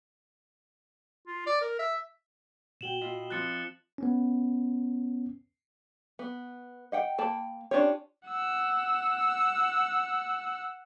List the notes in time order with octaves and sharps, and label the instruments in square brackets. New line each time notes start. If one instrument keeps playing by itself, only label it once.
[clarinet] F4
D5
A#4
E5
[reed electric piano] A#2 F#4 G5 [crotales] E7 F#7 G7
[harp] E4 F4 D#5
[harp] F3 C4 [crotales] F#6 A6 C#7
[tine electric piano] B3 C#4
[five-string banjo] B3
D#5 F#5 G5
A#3 G5 A5 B5
C#4 D4 F4 G4 C#5
[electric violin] F#5 E6